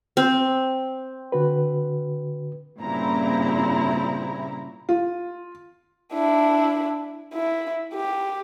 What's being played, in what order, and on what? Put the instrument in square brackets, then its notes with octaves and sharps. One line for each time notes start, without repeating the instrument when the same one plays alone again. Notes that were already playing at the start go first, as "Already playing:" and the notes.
[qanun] C4
[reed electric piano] D3 F#4 B4
[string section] G2 A#2 C#3 C4 E4 A#5
[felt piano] F4
[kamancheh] D4 E4
E4
G4